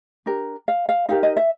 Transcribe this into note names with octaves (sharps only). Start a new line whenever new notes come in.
D4 G4 A#4
F5
F5
D#4 G4 A#4 F5
D#5
E5